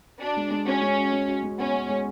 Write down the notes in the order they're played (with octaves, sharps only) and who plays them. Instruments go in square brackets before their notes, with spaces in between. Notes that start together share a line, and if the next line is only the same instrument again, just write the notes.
[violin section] D4 [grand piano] F#4
[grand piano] G#3
G#3
[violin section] C#4 [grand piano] F#4
[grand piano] G#3
F#4
G#3
F#4
G#3
[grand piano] B3 [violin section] C#4
[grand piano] B3
G#3